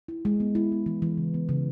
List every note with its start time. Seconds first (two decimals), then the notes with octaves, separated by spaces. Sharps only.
0.08 E4
0.25 G#3
0.40 B3
0.55 E4
0.72 B3
0.86 E3
1.02 E3
1.17 C#3
1.34 B3
1.49 C#3